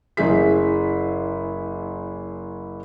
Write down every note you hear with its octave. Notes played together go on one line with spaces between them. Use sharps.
F#1 E4 G#4 B6